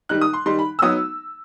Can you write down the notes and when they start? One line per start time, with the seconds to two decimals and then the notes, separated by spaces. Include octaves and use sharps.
0.09 D#3 G3 D#4 F#6
0.21 D#6
0.33 C6
0.46 D#3 G3 D#4 C6
0.59 B5
0.79 E6
0.82 F#3 B3 D#4 D#6